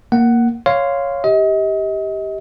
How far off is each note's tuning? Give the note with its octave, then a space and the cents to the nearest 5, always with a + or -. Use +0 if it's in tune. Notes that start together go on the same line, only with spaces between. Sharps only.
A#3 +0 F#5 +10
C#5 +0 F5 +0 C6 -15
G4 +0 D#5 +35